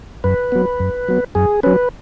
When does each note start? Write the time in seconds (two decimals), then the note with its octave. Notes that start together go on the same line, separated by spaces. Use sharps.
0.24 F#2 B4
0.52 F#3 B3
0.80 F#2
1.08 F#3 B3
1.35 F#2 G#4
1.63 F#3 C#4 B4